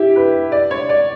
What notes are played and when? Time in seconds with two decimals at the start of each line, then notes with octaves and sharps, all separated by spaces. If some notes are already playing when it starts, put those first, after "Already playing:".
Already playing: E4 G4
0.16 B4
0.52 D5
0.71 C#5
0.89 D5